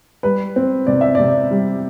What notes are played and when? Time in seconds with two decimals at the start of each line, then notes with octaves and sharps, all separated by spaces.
0.23 G3 B4
0.56 C4
0.87 C3 D5
1.01 E5
1.15 C3 D5
1.51 G3